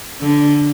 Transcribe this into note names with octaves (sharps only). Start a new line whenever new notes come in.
D3